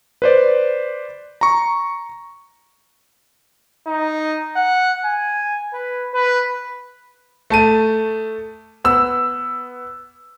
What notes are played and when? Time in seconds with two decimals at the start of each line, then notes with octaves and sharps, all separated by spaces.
0.22 B4 C5 D5
1.41 A#5 C#6
3.87 D#4
4.56 F#5
5.05 G#5
5.73 B4
6.14 B4
7.50 A3 A5 D#7
8.84 B3 E6